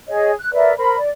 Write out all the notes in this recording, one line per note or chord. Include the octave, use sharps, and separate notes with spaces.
G#4 C#5 D#5
F#6
A#4 B4 D5 E5
A#4 C5 B5
D5